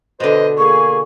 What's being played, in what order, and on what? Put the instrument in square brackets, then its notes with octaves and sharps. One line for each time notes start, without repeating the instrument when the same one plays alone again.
[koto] B2 D3 [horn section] B4 C5 D#5
[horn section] A#3 G#4 [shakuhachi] C#6